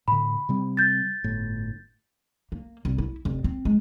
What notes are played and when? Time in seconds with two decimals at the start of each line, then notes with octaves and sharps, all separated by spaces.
0.08 A2 D3 B5
0.49 C3 G3 C4
0.77 G6 A6
1.24 G1 A2
2.52 A#3
2.85 C2
2.98 E4
3.25 F1
3.44 C4
3.65 G#3